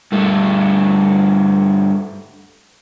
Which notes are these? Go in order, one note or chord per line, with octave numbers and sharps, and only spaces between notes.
G2 A3